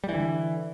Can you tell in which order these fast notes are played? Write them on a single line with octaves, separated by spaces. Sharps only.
G3 E3 D3